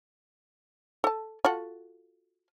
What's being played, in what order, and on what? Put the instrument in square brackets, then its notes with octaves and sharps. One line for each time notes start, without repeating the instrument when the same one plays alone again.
[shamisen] A4 A5
F4 F#4 A4